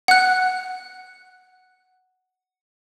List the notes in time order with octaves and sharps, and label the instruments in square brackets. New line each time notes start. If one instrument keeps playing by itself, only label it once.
[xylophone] F#5 F#6